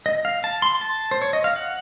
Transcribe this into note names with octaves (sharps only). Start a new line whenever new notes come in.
D#5
F5
A5
C6
A5
C5
C#5
D#5
F5
F#5